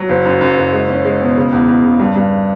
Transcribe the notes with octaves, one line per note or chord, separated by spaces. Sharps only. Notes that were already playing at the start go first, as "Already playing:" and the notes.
Already playing: F#3
F#1
F#2
F#2
F#1
G#3
C#4
G#3
B2
C#3
E2
E2
C#3
G2
G2